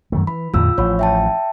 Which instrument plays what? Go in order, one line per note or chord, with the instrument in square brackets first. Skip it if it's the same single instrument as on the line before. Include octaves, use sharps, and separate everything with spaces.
[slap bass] F#2 D#3 A3
[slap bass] E3 [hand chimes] B5
[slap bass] E2 A2 D3 [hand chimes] F4 E6
[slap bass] A1 F3 [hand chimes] C#5 B5
[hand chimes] E5 G5 A5